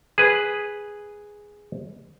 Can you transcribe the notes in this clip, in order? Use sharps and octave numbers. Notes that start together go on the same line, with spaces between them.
G#4 B4